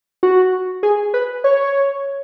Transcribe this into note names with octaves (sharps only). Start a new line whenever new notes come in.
F#4
G#4
B4
C#5